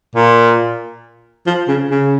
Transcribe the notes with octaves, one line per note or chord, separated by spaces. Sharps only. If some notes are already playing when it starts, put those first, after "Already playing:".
A#2
F3
C#3
C#3